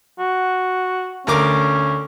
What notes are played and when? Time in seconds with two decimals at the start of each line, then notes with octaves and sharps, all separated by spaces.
0.19 F#4
1.27 D2 C#4 A#4 D6